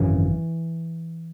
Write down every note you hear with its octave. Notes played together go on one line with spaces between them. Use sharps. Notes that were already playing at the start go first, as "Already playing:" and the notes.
Already playing: G#1 F#2 C#3 E3